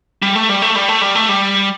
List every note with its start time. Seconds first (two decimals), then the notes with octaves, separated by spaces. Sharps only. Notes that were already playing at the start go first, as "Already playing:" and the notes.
0.22 G3
0.35 A3
0.49 G3
0.62 A3
0.76 G3
0.89 A3
1.02 G3
1.15 A3
1.29 G3